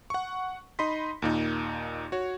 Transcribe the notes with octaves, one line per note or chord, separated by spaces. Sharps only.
F#5 C#6
D#4 D#5 B5 C6 B6
D#2 A#2 D#4
F#4 C#5